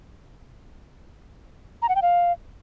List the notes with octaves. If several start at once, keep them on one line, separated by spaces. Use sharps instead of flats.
A#5
F#5
G5
F5